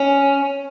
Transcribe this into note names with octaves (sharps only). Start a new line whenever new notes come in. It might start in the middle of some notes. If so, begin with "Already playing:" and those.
Already playing: C#4